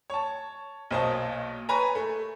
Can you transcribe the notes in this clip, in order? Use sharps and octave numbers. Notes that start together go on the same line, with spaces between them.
C#5 A5
B1 A#2 C5 C#5 D#5 A5
B4 C#5 G#5 A#5
A3